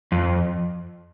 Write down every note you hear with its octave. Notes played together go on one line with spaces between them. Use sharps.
F2